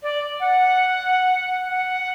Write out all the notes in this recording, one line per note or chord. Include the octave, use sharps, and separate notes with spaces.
D5
F#5
F#5